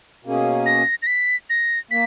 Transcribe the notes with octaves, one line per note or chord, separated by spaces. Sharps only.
B2 A#3 C#4 G#4
A#6
A#6
B6
A#6
A#3 B6